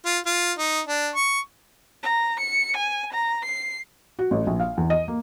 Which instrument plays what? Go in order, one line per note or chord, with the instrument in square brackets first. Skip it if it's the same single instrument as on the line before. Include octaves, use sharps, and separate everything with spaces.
[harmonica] F4
F4
D#4
D4
C#6
[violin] A#5
C#7
G#5
A#5
C7
[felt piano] F#4
A1
A#1
F5
E2
D#5
A#3